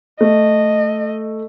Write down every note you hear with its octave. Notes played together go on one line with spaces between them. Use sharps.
A3 D#5